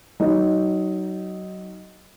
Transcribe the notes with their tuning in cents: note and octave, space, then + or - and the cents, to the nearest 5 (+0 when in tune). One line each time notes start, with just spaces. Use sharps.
F#3 +25 D#4 +5